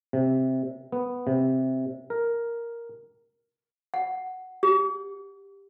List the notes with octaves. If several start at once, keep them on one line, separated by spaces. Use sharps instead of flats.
C3
B3
C3
A#4
F#5
G4